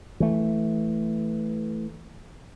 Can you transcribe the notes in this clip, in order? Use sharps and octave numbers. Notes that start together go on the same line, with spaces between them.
E3 A3